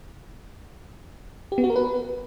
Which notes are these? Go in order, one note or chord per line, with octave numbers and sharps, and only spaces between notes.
G4
B3
F#4
A#4
B4